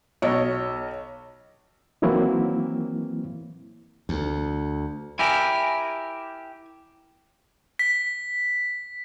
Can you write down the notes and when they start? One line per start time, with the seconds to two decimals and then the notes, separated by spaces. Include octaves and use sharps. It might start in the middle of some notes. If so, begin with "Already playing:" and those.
0.22 B1 C#5 D#5
2.02 D#3 E3 F#3 A#3 C4 E4
4.09 D2
5.19 E4 G4 A#4 G#5
7.79 B6